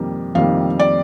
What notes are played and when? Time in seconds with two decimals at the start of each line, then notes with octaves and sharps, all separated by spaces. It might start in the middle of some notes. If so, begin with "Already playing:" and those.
Already playing: F2 D#3 G3 A#3
0.35 F2 D#3 G3 A#3 F5
0.80 D5